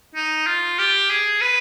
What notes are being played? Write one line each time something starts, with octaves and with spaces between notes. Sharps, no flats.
D#4
F4
G4
G#4
B4